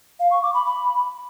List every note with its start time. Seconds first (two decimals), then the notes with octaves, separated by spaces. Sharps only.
0.20 F5
0.31 C#6
0.43 D6
0.54 B5
0.66 B5